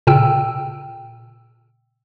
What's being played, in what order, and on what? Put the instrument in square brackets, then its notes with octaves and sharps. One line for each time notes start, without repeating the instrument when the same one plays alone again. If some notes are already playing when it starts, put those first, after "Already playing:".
[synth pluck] A#2 C#3 G5 E6